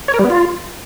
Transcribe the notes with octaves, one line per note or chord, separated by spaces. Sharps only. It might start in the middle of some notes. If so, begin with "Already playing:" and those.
C#5
A#4
G3
B3
F4